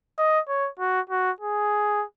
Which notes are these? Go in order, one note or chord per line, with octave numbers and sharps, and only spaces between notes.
D#5
C#5
F#4
F#4
G#4